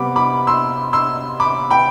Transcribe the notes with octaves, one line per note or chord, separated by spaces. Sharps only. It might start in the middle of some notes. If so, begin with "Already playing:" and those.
Already playing: C3 G3 B3 B5 D6
B5 D6
C6 E6
C6 E6
B5 D6
G5 B5